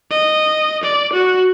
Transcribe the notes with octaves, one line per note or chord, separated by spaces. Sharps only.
D#5
D5
F#4